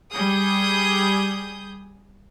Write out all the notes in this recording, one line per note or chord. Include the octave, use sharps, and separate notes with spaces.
G3 G#4 D#6 G6